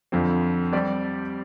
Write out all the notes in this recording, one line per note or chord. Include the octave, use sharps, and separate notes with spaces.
F2 D3 F3 C4
G3 C4 G4 D5